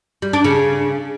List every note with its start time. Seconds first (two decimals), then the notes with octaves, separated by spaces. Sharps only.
0.22 G3
0.33 D4
0.44 C#3